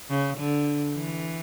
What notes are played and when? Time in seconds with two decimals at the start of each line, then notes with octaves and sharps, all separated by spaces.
0.10 C#3
0.38 D3
0.94 E3